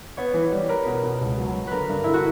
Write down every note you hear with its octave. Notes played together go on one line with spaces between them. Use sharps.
B3 C#5
E3
G3
A#4 B4
B2
B2
C#2
F#3
F#3
D3 A#4 B4
G2
D3 E4
F#4